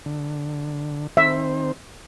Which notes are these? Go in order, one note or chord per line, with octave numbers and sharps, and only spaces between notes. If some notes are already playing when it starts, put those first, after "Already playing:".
D3
D#3 C4 C5 E5